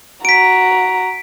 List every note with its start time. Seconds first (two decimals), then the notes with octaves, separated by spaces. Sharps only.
0.25 F#4 A#5 B6 D7